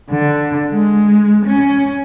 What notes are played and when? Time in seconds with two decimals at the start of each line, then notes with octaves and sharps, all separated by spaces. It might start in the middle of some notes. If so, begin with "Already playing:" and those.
0.10 D3
0.71 G#3
1.46 C#4